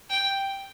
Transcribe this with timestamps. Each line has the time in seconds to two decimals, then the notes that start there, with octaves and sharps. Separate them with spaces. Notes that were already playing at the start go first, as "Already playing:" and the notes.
0.10 G5